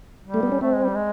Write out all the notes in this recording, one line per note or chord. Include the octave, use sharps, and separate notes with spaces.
G3
A3
B3
C#4
A3 C4
G#3
G3
G#3